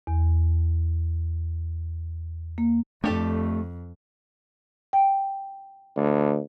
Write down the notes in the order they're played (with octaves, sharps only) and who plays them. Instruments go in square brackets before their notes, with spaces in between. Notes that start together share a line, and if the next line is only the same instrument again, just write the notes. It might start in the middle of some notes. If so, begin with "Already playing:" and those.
[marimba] E2
A#3
[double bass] F2 [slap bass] A3 [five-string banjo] D4 G4 A4
[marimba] G5
[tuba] D2